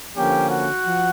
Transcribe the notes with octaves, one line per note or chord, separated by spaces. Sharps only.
D3 F3 A#3 C#4 G4 G5
F#4 F#5
F3